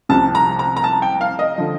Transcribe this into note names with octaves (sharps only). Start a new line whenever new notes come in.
C2 C3 F3 A5
A#5
A#5
A#5
A5
G5
F5
D#5
D3 F3